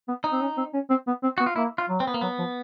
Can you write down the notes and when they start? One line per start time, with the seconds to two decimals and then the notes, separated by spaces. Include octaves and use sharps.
0.08 B3
0.24 D#4
0.32 C4
0.41 C#4
0.57 C4
0.74 C#4
0.90 C4
1.07 B3
1.23 C4
1.38 B3 F#4
1.46 F4
1.56 A#3 E4
1.78 F4
1.89 F#3
2.00 C4
2.07 B3
2.14 A#3
2.21 F#3 B3
2.39 F3